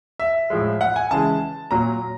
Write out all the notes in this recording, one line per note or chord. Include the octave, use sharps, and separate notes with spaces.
E5
A2 F3 G#3
F#5
G#5
C#3 E3 G#3 A5
A#2 F#3 A#5